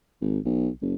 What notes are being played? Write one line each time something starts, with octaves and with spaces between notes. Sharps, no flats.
G#1
B1
F#1